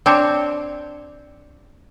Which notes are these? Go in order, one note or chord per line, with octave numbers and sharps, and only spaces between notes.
C4 D4 C5 C#5